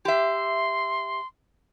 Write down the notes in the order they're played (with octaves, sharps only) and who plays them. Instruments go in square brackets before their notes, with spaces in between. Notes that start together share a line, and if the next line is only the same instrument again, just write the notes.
[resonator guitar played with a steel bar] G4 E5 [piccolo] C6